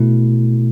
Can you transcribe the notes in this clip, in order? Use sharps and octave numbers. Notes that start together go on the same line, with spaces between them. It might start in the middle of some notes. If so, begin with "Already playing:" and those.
Already playing: B2 A3 E4